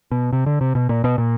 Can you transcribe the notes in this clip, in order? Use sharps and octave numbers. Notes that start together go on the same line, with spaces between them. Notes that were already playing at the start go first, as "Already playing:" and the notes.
B2
C3
D3
C3
B2
A#2
B2
A#2